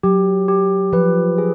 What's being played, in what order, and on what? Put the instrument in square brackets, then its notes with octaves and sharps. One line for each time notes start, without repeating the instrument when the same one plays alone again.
[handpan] F#3 [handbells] G4
[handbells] G4
[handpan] F3 [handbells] B4
[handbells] G#4